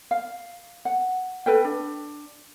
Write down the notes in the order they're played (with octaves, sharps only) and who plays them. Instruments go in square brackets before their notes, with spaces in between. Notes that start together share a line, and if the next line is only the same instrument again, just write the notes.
[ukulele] F5
F#5
A4 B4 G5
D4